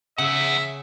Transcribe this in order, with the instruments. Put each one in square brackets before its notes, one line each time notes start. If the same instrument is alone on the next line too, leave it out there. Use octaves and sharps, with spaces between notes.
[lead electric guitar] E2 F#5 [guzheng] C#3 [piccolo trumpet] E5